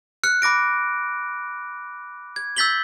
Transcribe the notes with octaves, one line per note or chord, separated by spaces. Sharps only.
F6 F#6 C#7
B5 D6 A#6 D7
G#6
E6 G6 A6 B6 F#7 G7